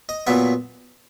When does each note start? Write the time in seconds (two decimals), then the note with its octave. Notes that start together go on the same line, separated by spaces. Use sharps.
0.09 D#5
0.27 A#2 F#3 B3 E5